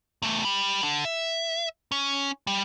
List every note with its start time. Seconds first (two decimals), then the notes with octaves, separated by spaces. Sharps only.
0.22 E2 A3
0.45 G4 B5
0.83 D3
1.05 E5
1.92 C#4
2.47 G3